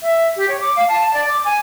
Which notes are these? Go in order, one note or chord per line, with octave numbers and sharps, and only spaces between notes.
E5
G4
C#5
D6
F5
A5
D5
D6
G#5